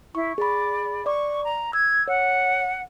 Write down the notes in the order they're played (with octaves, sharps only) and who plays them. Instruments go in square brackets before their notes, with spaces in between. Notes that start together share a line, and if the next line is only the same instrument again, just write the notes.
[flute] E4 [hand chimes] C#6
[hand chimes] G#4 B5 [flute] D5
[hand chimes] D5 D6 [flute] C#6
[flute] A#5
[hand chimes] E6 [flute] G#6
[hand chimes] C#5 [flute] F#5